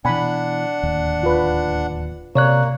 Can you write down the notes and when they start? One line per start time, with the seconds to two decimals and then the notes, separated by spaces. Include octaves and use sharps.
0.05 B2 E3 D4 F#5 G#5 B5
0.83 D1 D#2
1.23 F4 B4
2.35 C3 A#3 C#5 D5 F#6